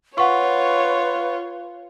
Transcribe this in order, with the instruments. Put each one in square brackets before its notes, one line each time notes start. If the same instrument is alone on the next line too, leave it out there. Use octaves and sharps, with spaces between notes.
[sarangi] F4 [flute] B4 [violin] C#5 [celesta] F#5 C#6